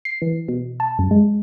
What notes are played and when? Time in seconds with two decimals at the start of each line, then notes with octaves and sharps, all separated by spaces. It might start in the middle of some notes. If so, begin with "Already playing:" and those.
0.05 C7
0.22 E3
0.48 B2
0.80 A5
0.99 F#2
1.11 G#3